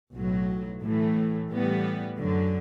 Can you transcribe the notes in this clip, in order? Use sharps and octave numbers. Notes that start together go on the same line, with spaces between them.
B1 A2 F#3
A2 E3 A3
A2 E3 G3 B3
F#2 D3 F#3